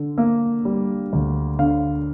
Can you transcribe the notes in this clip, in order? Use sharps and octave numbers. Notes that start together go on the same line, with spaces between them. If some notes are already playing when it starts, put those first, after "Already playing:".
Already playing: D3
A#3
G3
D2
D3 F5